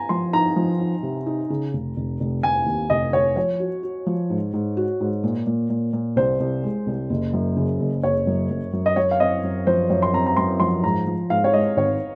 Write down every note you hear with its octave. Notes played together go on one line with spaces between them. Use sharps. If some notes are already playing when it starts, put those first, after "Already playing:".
Already playing: G#5 A#5
F3 C6
D#4 A#5
F3
D#4
C3
D#4
C#3
F1
F1
F1
F1 G#5
D#2
F1 D#5
F1 C#5
F3 C#5
F#4
F#4
F3
G#2
G#2
F#4
G#2
A#2
A#2
A#2
A#2
C2 C5
C2
G#3
C2
F#1
F#2
C#3
F#1
F#1 C#5
F#2
F#2
F#2
D#5
F#2 C#5
F5
C4 D#5
F#2
F3 C5
F#2 C#5
C6
C4 A#5
A#5
F#2 C6
F3 C6
G#2 A#5
F3
G#2 F5
C#5
G#3 D#5
G#1 C#5